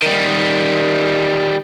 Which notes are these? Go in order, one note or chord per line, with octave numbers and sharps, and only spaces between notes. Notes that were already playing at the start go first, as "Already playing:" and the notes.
D#3 G3